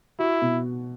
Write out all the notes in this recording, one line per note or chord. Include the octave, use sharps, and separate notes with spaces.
E4 F#4
B2